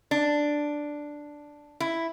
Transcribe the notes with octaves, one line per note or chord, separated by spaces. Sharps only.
D4
E4